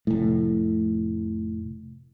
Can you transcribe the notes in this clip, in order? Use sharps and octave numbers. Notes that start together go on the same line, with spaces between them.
F1 A2